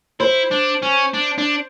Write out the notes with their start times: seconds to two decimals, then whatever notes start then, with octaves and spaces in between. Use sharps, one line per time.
0.20 E4 C5
0.52 D4
0.83 C#4
1.14 D4
1.38 D4